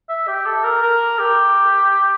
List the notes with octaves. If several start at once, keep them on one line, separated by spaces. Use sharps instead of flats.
E5
G4
A4
A#4
A#4
G4